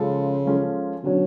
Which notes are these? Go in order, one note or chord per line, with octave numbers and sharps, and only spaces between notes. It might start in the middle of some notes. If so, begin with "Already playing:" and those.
Already playing: C#3 F3 G#3 C#4 F4 A4
F3 G#3 C#4 F4 A4
B2 D3 F#3 C#4 F#4 C#5